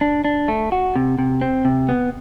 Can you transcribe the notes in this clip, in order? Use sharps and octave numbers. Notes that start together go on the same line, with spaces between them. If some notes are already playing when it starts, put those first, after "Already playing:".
D4
D4
A3
F#4
C3
C3
C4
C3
B3